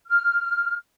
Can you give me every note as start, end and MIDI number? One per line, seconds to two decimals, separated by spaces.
0.07 0.75 89